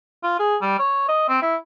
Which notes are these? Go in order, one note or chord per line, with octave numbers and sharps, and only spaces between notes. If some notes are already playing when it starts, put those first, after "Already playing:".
F4
G#4
G3
C#5
D#5
C4
E4